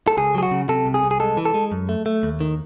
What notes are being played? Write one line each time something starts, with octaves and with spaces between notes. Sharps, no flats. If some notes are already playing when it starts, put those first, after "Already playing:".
A4
C#2 G#4
F#3 G#4
F#4
C#3
C3 A4
C2
G#4
C2
G#4
G#3 A4
E3
A4
G#3
F#2
A3
A3
D#2
D#3